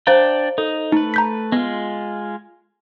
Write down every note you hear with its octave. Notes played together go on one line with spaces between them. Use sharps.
D4 C5 D5 F5 G5 A#5
D#4 A4
A3 D#4 B4
A#5 G6 B6
G#3 B3 F4